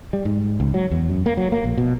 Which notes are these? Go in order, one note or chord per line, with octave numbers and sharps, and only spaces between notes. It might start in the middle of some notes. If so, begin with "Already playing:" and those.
G3
G#2
C#2
F#3
E2
F#2
A#3
F#3
A#3
A#1
B2